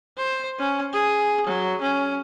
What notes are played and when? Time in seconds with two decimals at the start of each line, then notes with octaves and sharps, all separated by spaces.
0.17 C5
0.58 C#4
0.93 G#4
1.46 F#3
1.81 C#4